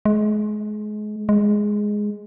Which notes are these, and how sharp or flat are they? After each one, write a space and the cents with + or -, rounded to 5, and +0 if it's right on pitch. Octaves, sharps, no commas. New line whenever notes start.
G#3 +30
G#3 +0